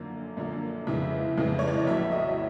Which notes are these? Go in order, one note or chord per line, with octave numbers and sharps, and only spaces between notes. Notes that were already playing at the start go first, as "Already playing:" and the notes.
Already playing: F#2 D3 F3 A#3
F#2 D3 F3 A#3
F2 C#3 E3 G#3 E5
F2 C#3 E3 G#3
C#5
D5
D#5
A#1 A2 F#3 B3 E4 E5
D#5